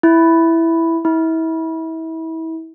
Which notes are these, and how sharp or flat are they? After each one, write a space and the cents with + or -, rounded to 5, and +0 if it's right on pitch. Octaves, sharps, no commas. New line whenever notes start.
E4 +0
E4 -30